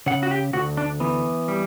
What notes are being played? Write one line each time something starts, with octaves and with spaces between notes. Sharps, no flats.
C#3 F#5
F#4
G4
D2 F#4
D4
E3 B3
G3